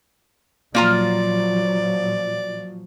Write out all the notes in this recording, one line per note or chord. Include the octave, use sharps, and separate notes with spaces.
A#2 F3 F#3 A#3 F4 D5 A#5